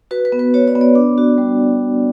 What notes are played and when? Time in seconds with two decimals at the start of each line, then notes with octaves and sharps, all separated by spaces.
0.11 F#4 B4
0.25 B4
0.32 B3
0.39 B4
0.54 F#4 C#5
0.68 D5
0.75 B3
0.81 D5
0.95 D4
1.18 F#4
1.38 G3